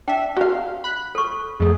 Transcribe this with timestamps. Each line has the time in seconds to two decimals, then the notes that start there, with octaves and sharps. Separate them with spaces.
0.08 D4 E5 G5
0.37 F#4 F5
0.84 B5 F#6
1.15 A4 C#6
1.60 F2 A3 G#4